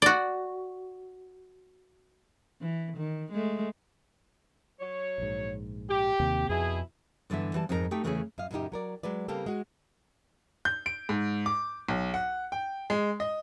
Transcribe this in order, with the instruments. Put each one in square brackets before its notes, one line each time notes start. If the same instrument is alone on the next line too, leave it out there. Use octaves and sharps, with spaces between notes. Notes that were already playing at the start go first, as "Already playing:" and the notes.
[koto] F#4 D5
[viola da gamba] E3
D#3
G#3 A3
[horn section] F#3 C#5
[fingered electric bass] A#1 G#2
[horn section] G4
[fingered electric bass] D#2 C3 A#3
[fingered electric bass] F2 [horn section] B2 E4 G#4
[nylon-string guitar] G2 D3 E3 B3 E5
E3 G3 A5
F2 G#2 D#4 F#4 A#4
A3 D#4 G4 G5
E2 C#3 E3 A3 C#4 G#4
F#2 D#5 F5
F#2 A#2 C#3 D#4 G4
F#3 A#4 D5
F#3 G#3 B4 D5
C#3 G3 A#3 C4 G4 A4
G#3 F#4
[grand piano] G6
D7
G#2
D6
B1
F#5
G5
G#3
D#5